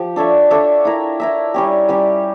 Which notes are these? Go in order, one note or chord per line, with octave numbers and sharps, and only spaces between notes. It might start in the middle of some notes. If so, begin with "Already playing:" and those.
Already playing: F3 G4
D4 A4 C#5 E5
D4 A4 C#5 E5
E4 A#4 E5
E4 A#4 E5
G3 C#4 G4
G3 C#4 G4